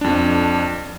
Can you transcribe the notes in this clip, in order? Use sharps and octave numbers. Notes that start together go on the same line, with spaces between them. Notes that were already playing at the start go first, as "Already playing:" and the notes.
F2 D4